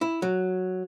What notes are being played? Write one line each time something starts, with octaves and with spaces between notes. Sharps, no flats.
E4
F#3